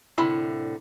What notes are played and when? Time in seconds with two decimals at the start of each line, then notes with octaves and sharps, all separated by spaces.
0.18 C2 A2 D3 E4 B5 C6